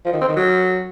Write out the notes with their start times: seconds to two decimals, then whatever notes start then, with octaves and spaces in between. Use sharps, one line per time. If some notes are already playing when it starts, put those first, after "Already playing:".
0.05 F3
0.13 D#3
0.21 C4
0.28 D#3
0.36 F#3